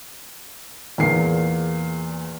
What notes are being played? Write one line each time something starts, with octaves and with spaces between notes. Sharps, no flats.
E2 A#2 A#3 G#4 C7